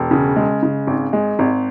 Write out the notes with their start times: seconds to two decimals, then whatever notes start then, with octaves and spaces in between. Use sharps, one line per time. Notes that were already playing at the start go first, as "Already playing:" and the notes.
Already playing: E1
0.11 C#3
0.36 G#3
0.63 C#3
0.87 G#1
1.13 G#3
1.39 G#1